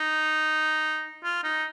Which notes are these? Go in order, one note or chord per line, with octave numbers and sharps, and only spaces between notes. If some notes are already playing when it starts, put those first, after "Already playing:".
Already playing: D#4
F4
D#4